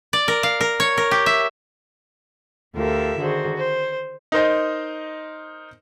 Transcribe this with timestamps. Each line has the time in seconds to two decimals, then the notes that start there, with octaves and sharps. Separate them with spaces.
0.13 D5
0.28 A#4
0.43 F5
0.61 A#4
0.80 C#5
0.98 A#4
1.11 G4
1.26 E5
2.75 D2 F4 G4 A4 A#4 E5
3.19 D3 D#3 F#4 G#4 C5
3.57 C5
4.32 D#4 A#4 C5 D#5